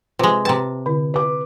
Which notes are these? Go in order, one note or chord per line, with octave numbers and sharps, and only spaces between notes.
C3 G#3 F4 B4 C5
C3 B4 G5 A5 A#5
D3 E4
B4 D6